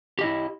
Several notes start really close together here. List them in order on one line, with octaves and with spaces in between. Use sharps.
G4 D#5 E4